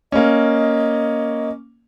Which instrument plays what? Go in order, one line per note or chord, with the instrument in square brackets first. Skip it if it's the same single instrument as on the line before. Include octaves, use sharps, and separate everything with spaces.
[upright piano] A#3 C#4 [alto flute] D#5